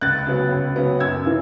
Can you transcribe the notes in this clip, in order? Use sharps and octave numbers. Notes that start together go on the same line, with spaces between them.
C#2 F#6 A6
C#3 F#3 B3
C#2
C#3 F#3 B3
F#2 E6 G#6
C#3 E3